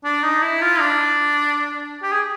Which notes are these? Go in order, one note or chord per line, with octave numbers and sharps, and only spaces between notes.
D4
D#4
E4
F4
D4
G4
G#4